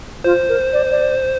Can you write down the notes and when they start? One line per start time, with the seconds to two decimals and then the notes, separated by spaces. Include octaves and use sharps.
0.24 F4 C5
0.49 A#4
0.73 D5
0.91 D5